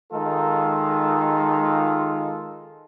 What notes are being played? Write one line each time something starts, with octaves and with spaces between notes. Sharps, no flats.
D#3 G#3 D#4 F4 A4